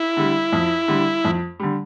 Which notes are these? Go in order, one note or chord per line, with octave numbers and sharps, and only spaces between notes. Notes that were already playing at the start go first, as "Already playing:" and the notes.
Already playing: E4
D3 G3
F2
D3 G3
F2
D3 G3